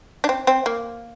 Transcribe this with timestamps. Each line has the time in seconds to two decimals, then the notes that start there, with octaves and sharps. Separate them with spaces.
0.24 D4
0.29 C4
0.47 C4
0.66 A#3